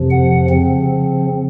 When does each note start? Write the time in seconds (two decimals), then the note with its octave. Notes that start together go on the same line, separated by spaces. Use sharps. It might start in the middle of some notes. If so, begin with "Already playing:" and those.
Already playing: F2 C3 F3
0.10 F#5
0.49 C#3 F3 C4